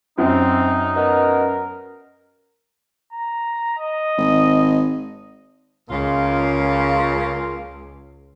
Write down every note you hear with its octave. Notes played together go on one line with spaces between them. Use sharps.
F#2 C4 D#4
B2 A#4
A#5
D#5
G#1
C#2 C#3 A#3 F4